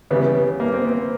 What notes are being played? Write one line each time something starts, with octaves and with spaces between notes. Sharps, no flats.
C#3 E3 G3 B3
B3
A#3
C4
B3